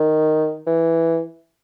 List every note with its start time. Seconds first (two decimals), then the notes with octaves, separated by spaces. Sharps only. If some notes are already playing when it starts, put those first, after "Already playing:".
Already playing: D#3
0.67 E3